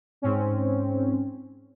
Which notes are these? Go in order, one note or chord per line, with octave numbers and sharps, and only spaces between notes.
G#2 C4 C#4